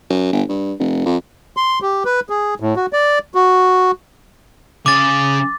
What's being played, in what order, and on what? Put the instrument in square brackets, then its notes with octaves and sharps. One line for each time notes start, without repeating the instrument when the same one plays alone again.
[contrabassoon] F#2
G1
G2
F1
F2
[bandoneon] C6
G4
B4
G#4
A2
F#4
D5
F#4
[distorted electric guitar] C#3 G#4 [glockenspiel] D6 A6